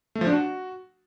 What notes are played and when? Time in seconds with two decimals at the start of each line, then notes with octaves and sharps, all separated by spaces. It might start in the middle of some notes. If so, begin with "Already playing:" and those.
0.15 A3
0.21 F3
0.27 D4
0.32 F#4